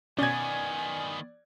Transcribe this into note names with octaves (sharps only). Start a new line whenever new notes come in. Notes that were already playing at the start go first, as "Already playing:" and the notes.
B2 D#3 B3 C#4 D5 G#5 G#6